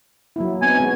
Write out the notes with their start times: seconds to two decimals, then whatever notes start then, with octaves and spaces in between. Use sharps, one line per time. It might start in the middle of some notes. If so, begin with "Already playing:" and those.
0.36 F#3 A#3 E4
0.62 B3 C4 D#4 G#5
0.80 G#3 B3 F#4